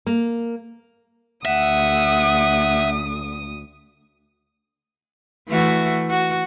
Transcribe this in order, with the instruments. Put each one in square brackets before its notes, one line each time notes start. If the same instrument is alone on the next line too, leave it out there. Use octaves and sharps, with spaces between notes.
[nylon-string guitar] A#3
[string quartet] D2 D#6 [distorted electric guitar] E5 [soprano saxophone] F#5
[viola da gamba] E3 A3 F#4
F#4